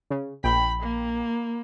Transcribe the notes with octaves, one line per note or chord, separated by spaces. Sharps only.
C#3
A#1 G5 B5
A#3